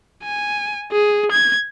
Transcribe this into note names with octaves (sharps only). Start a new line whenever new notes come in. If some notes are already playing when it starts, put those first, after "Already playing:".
G#5
G#4
G#6